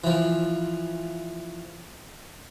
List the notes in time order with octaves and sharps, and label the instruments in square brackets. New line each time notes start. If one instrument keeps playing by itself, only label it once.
[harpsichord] E3 F3